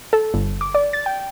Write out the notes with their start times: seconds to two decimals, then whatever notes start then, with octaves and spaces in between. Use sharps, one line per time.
0.13 A4
0.34 G1
0.61 D6
0.75 D5
0.93 A6
1.06 G5